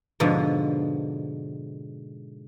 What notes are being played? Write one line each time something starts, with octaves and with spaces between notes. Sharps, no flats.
G#2 B2 D3 F3